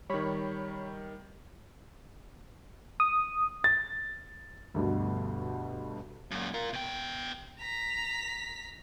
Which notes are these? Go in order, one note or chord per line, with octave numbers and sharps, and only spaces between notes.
D#3 G3 C#5 B5
D#6
A6
D2 G2 B2
F#2 A#2
F4 A#4
B2 G5
A#5 B6